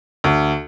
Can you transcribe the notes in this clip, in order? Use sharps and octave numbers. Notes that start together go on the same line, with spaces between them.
D2